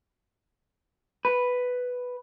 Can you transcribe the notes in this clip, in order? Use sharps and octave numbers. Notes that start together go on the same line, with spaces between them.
B4